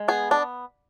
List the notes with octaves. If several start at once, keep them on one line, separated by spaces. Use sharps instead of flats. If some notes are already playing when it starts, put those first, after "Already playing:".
Already playing: G#3
B3 G#4
D4